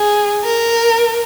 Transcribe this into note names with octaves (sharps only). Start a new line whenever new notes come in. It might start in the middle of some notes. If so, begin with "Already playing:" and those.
Already playing: G#4
A#4